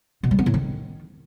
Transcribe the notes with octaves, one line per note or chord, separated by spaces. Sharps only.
B2
G3
B3
A2
D#3